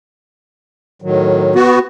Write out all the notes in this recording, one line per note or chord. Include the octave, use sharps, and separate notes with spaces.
A2 D#3 F#3
B3 F#4